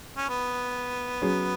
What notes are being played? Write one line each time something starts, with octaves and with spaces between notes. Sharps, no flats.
C#4
B3
F#3 C#4 G#4